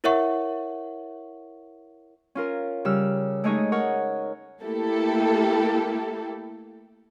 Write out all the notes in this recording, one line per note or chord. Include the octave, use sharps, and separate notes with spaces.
E4 A#4 C#5 E5 F#5 C#6
C#4 F4 A#4
C#3 G3 E6 F6
G#3 A3 D#4 G#4 C#5 D#5
A#4 C#5 F#5
A3 A#3 E4 G4 A4